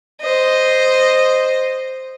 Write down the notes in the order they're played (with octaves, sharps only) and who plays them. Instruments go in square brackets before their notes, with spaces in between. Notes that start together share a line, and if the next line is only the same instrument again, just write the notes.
[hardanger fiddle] C5 D#5